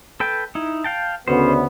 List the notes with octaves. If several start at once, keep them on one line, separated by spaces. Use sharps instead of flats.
A4 B4 G5
D#4 E4
F5 G5 A5
D2 C#3 B3 C#4 C5